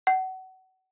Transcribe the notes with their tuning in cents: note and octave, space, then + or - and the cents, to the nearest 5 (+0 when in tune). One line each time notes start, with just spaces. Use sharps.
F#5 +30